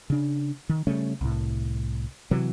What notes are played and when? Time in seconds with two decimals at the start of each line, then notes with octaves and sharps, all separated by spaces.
0.10 C#3 D4
0.69 D#3
0.87 C#3 G3 A3 C#4
1.21 C2 A2
2.31 C3 E3 F#3